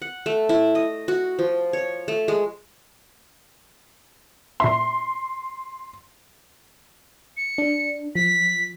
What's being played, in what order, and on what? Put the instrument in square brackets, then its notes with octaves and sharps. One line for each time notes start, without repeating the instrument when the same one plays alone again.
[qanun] F#5
A3
E4
D#5
F#4
F3
C#5
A3
G#3
[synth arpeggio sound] A#2 E5 [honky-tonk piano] C6
[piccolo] C#7
[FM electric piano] D4
[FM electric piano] F3 [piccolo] B6